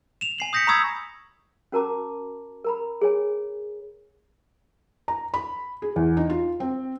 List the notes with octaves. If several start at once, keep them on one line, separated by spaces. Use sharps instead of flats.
E7 F7
G#5 C7 F#7
D#6 G6 A#6 B6 C#7
A#5 B5 C#6 D#6 E6 G#6
C#4 F#4 A#4 A5 A#5 D6
A#4 A#5 B5
G#4 C#5 G#5
A#5
B5
G#4
E2
D#4
F4
C4